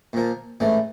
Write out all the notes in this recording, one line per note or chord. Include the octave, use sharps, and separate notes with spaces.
A#2 F3 A#3
A1 G#2 E3 A3